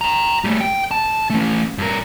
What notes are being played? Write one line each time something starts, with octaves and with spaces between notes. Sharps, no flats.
G5 A#5
G3 A3
G5
A5
A3 C#4
G2 A#4